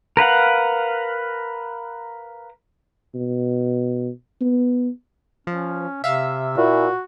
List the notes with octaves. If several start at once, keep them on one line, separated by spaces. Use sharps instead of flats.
A#4 B4 F5 F#5
B2
B3
F3 C#4
C3 E5 F5 E6
A#2 E4 F#4